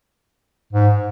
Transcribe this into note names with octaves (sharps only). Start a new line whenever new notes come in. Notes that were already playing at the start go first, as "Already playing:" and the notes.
G#2